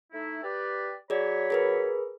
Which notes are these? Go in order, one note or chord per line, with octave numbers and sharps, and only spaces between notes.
A3 D#4 E4
G4 B4 D5
F#3 G#4 C#5 D5 B5
G#4 A#4 B4